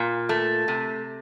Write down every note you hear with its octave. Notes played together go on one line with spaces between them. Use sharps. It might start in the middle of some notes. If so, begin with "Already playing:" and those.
Already playing: A#2
A3
C3